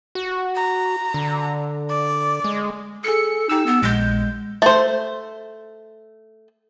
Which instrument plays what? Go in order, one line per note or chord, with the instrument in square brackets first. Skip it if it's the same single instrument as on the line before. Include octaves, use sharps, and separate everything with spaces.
[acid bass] F#4
[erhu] A#5
[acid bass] D3
[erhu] D5
[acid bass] G#3
[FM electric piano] G#4 C#7 [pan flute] A4
[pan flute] D#4 [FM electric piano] G4 E6
[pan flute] B3
[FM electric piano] A#1 G6 [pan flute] G#3
[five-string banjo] A3 C5